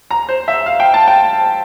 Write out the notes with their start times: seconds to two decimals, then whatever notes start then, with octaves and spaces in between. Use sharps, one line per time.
0.11 A#5
0.29 C5
0.48 E5
0.66 F5
0.80 G5
0.94 A5
1.08 G5